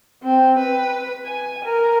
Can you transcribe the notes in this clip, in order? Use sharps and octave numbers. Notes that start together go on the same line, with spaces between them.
C4
B4
G#5
A#4